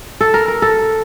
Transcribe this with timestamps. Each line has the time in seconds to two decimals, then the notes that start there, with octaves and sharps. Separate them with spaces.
0.21 A4
0.34 A#4
0.48 A#4
0.62 A4